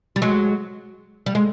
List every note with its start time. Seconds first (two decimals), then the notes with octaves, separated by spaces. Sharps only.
0.16 G3
0.22 F#3 G#3
1.26 G3
1.35 G#3